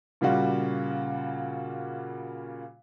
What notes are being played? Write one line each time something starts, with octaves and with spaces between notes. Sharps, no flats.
A#2 C#3 G3 F4 F#4